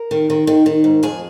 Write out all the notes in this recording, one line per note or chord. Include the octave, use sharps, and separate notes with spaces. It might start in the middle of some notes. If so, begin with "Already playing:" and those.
Already playing: A#4
D#3
D#3
D#3
D#3
G#2
F2 G#4